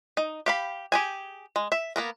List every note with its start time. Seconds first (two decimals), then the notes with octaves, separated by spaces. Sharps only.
0.17 D#4
0.46 G4 F5 B5
0.92 G4 G#4 G#5
1.56 G#3
1.72 E5
1.96 A#3 B3 A#4